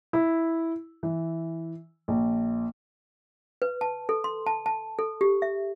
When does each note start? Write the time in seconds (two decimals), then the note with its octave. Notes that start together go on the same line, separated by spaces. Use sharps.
0.13 E4
1.03 E3
2.08 A#1
3.62 B4
3.81 A5
4.09 A4
4.24 C6
4.46 A5
4.66 A5
4.99 A4
5.21 G4
5.42 E5